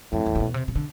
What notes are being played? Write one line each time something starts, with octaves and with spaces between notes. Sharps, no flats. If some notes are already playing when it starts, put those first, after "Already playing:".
F2 A2
E2
C3
B2
C3
C3
D3